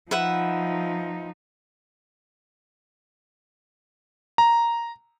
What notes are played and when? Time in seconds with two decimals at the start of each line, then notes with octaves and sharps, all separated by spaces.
0.11 F3 D#4 B4 E5 F#5
4.38 A#5